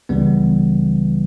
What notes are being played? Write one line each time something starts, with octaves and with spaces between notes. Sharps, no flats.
C#2 C#3 E3 G3 B3